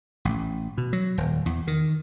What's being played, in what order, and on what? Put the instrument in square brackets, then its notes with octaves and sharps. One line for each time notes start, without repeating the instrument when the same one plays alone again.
[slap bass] A1
B2
F#3
D#1
E2
D#3